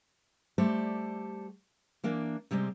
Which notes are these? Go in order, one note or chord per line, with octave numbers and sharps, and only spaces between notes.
G3 A3 G4 A4 C5 D5
E3 A#3 D4
C3 G3 G#3 C4